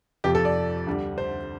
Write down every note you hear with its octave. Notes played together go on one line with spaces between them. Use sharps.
F2 C3 F3 G4
A4
D5
D2 D3 G3
C5